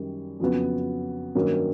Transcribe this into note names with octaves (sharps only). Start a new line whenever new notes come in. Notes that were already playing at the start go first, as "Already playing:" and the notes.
Already playing: F#2 D#3 G3
F2 C#3 F#3 B3
G2 D#3 F#3 A#3 C#4